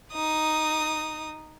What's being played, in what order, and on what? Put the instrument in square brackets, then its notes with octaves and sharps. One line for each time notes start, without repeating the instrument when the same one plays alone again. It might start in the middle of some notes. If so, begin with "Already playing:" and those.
[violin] D#4 D#6